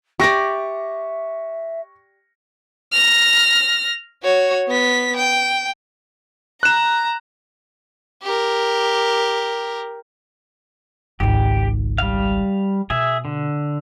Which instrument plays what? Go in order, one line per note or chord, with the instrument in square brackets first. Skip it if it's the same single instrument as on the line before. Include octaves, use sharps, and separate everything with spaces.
[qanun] G4 D5 [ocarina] E5 [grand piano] C#6 A#6
[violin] F6 A#6
F#4 C#5
B3 B6
G5
[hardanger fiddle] A#5 [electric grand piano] F#6 E7
[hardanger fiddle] G4 A#4
[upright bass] G#1 C#2 [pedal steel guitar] G4
[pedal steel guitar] G3 F5
[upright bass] B2 [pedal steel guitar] G#4 E5
[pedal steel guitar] D3